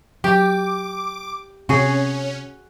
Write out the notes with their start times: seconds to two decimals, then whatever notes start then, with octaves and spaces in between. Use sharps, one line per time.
0.24 F#3 G4 D6
1.69 C3 C#4 F#4 G#4